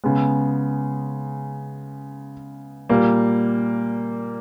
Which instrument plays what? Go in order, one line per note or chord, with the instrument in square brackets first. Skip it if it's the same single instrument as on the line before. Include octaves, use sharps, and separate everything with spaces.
[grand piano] C#3 G#3 B3
A#2 G3 A#3